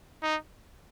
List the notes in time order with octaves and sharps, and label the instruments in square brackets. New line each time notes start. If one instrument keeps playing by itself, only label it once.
[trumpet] D#4